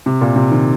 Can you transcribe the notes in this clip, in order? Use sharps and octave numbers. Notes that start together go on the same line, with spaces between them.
C3
A#2
C3
D#3